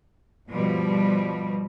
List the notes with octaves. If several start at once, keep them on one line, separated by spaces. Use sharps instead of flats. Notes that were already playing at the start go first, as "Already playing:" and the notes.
G2 B2 F3 G3